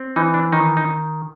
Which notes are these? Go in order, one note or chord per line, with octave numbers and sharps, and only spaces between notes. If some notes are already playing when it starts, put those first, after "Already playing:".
Already playing: C4
E3 D#4
D4
D#3 D#4
D#4